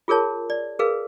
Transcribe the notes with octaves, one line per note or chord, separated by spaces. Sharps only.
F4 G#4 A#4 C#5 A5
D5
G#4 A#4 B4 F5